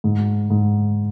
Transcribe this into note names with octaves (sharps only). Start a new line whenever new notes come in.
G#2
G#2